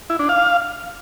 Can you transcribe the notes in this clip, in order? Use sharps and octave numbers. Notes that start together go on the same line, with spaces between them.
E4
D4
F5